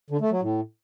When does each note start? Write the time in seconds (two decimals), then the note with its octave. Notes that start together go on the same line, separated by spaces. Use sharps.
0.10 D3
0.21 A3
0.31 F#3
0.42 A2